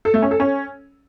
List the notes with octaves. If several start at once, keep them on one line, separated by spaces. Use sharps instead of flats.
A4
A3
C#4
A4
C#4